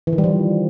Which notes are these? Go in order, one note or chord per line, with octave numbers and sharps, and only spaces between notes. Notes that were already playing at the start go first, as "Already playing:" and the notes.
E3
D#3
G3
F3